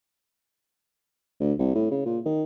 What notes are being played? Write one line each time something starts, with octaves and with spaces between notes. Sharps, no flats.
D2
C2
A2
C#3
A#2
D#3